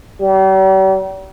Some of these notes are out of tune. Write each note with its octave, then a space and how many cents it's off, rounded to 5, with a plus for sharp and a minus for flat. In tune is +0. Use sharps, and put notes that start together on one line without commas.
G3 -45